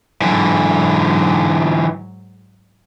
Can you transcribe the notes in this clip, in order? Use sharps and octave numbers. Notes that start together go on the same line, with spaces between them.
G#2 D3 E3 F#3